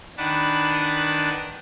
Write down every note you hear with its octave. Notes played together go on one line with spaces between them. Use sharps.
D#3 D4 B4 F#5 A5 D6